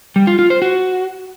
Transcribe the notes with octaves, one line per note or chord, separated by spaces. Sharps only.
G3
F4
F4
C5
F#4